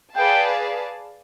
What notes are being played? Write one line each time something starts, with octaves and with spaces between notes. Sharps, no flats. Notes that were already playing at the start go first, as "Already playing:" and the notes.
G#4 B4 D5 F5 G5 A5